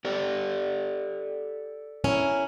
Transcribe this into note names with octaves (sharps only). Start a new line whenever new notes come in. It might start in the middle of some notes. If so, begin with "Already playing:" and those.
G4 A4 D5
C#4 E4 A#4